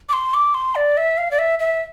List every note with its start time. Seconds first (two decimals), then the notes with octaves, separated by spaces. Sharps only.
0.09 D6
0.13 C6
0.34 D6
0.54 C6
0.75 D5
0.97 E5
1.18 F5
1.31 D5
1.39 E5
1.59 E5